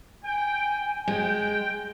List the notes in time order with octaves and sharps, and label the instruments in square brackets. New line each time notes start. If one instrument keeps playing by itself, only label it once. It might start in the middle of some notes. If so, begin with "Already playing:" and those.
[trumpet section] G5 [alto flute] G#5
[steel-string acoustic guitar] G#3 [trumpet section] G5